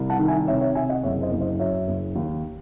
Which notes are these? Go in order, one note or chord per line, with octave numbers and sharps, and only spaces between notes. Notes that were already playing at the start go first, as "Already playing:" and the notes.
Already playing: C2
F#5 A5
D#3
E5 G#5
C3 C#5 E5
C#5 E5
C3 E5 G#5
D#5 F#5
F#1 C#5 E5
C5 D#5
F#1
C5 D#5
F#2 C#5 E5
F#1
D#2